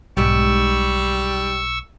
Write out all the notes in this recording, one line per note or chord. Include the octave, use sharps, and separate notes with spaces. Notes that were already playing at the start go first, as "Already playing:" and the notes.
B1 G#2 G3 B3 G4 C#6 E6